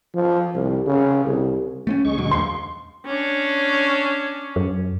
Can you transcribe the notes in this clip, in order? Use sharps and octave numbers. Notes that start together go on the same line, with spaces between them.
F3
C2
C#3
C2
A3 B3 C#4
D2 G#3 C#6
A#2 D3 F#3
E2 C6
C#4 D4
F#2